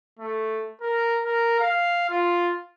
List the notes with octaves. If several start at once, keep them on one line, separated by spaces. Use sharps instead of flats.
A3
A#4
A#4
F5
F4